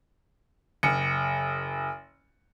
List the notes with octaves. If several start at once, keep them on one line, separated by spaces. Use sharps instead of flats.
F#1 C#7